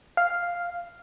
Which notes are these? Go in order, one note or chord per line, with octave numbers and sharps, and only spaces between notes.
F5